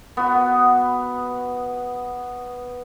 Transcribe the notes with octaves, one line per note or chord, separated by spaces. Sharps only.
B3 F#4